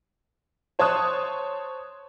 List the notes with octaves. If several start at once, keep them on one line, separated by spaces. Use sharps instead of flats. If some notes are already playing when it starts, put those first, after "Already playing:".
C5 C#5 A5 C6 D#6 F#6